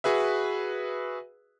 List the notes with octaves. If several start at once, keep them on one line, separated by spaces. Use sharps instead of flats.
F#4 G#4 B4 E5